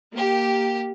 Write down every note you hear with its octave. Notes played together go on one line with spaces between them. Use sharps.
A#3 G4